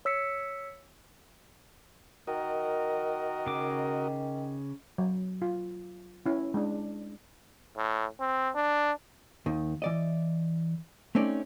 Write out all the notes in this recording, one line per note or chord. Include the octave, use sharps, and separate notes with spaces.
C#5 E6 B6 C#7
D#3 F#4 A#4 D#5
C#3 D6
F#3
F4
C#4 E4
G#3 D4
A2
C4
D4
D#2 D#3
E3 D5 D#5
A3 C4 C#4 D#4 D5